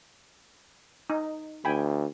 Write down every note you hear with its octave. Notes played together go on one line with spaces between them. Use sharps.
D#4
D2 G5 G#5 B5